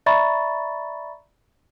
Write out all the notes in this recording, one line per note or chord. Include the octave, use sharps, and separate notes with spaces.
D5 E5 A#5 B5 C#6 A6